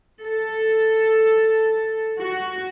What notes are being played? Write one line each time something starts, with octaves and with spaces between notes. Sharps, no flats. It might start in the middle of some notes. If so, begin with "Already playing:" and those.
A4
F#4